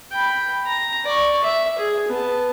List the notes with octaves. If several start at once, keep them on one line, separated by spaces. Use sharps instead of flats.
G5 B5
A#5
D5 C#6
E5
G#4
B3 A5